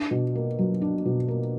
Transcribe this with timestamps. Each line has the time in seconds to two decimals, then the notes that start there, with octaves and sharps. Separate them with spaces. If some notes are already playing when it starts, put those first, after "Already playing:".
Already playing: D4
0.11 B2
0.35 A#3
0.58 F#3
0.82 D4
1.05 B2
1.28 A#3